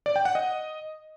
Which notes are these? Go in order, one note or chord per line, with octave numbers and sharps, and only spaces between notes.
D5
G5
F#5
D#5